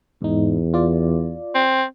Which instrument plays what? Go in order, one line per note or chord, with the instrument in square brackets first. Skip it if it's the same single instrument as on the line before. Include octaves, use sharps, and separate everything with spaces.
[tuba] E2 [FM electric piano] G#2 D#4
[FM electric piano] F4 D5
[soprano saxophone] C4